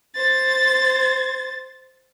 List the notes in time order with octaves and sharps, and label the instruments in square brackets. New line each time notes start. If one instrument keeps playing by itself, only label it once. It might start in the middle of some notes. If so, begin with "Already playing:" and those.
[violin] C5 A6